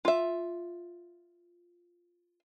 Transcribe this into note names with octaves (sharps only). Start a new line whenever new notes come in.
F4 E5